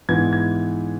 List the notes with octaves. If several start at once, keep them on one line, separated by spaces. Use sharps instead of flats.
G#2 E3 B3 G#6
G#6